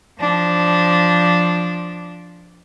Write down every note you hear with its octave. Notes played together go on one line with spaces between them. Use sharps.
F3 D4